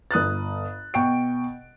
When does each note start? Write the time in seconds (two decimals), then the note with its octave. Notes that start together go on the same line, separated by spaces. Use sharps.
0.11 G1 D#6 F#6 A6
0.94 B2 G5 C#6 D7